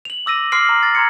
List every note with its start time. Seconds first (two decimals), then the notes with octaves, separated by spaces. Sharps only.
0.05 F7 F#7
0.26 D6 E6 A#6 D#7
0.52 C6 D6 F6 C7 D7 F#7
0.69 A#5
0.83 A6 A#6
0.95 A#5 C6 G#6 C#7